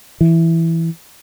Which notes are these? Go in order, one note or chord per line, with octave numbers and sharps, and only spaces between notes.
E3